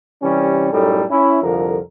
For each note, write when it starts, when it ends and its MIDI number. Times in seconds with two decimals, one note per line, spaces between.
0.21 0.71 48
0.21 0.71 52
0.21 0.71 55
0.21 0.71 61
0.72 1.02 42
0.72 1.02 45
0.72 1.02 55
0.72 1.02 63
0.72 1.02 69
1.09 1.37 61
1.09 1.37 64
1.41 1.77 36
1.41 1.77 41
1.41 1.77 50
1.41 1.77 53
1.41 1.77 70